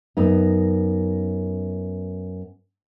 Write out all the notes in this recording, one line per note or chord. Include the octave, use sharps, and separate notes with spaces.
F#2 B3 D#4